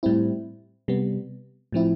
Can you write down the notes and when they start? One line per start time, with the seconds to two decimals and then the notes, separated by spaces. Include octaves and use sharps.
0.03 A2 G3 C4 E4
0.88 C3 G3 B3
1.72 A2 F3 C4 E4